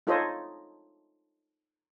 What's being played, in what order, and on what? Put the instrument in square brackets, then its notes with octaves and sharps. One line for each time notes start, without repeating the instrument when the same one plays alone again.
[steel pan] D#4 F4 A4 C5 C#5 D#5